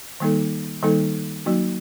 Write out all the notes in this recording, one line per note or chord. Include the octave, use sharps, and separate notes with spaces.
D#3 G3 A#3 D#4 A4
D#3 G3 A#3 D#4 A4
F#3 A#3 D#4 F#4